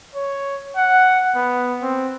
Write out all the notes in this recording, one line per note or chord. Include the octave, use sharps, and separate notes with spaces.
C#5
F#5
B3
C4